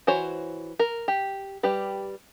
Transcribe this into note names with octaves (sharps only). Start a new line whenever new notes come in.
E3 F#4 C5 C#5
A#4
G4
G3 G4 B4